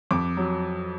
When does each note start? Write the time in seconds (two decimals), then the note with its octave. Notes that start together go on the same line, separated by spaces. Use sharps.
0.11 F2 D6
0.37 F#3